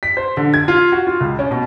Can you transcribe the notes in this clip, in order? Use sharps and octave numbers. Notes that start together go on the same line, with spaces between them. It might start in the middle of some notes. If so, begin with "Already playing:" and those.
B6
C5
D3
G#6
F4
F#4
F4
C#2
C#4
B2